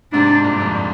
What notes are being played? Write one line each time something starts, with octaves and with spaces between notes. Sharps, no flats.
G#2 C3 D4
G2 A#2
F2 G#2